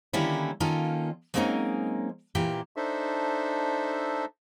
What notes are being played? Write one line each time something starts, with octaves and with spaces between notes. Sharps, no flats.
D3 D#3 G3 A#3 C#4 E4
D#3 A#3 C#4 D#4 F4 A4
F#3 G#3 A#3 C4 C#4 D#4
A#2 E3 A#3 G4
D4 D#4 A4 C5 E5